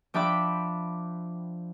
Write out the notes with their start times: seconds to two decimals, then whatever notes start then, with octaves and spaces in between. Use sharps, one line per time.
0.14 F3 D4 E5 G5 B5 D6